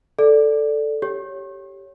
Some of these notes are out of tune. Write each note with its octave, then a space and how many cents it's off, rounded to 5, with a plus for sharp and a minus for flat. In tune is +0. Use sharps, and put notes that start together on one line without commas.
A4 +0 D5 +0
G4 +0 C#5 +0